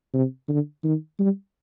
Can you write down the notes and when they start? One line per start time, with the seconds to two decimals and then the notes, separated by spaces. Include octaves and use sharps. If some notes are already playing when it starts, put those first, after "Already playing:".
0.14 C3
0.49 D3
0.84 D#3
1.19 G3